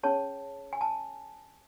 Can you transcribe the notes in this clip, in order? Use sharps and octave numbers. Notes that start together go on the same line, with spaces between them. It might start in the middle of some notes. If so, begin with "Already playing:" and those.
C#4 G#4 C#5 A5
G#5
A5